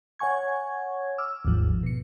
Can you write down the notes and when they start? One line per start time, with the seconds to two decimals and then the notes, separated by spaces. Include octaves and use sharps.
0.19 C#5 F#5 G#5 C#6 G#6
1.18 D6 E6 F6
1.45 G1 D#2 G#2 F3
1.83 B2 C#7